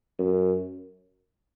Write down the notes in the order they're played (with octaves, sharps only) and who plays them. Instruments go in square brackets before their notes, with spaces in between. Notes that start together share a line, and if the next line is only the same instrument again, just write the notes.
[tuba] F#2